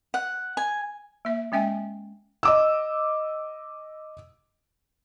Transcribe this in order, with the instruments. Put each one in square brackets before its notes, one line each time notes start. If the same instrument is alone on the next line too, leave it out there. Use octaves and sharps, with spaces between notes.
[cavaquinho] F#5
G#5
[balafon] A#3 E5
G#3 C#4 E5 G5 G#5
[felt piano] D#5 D6 E6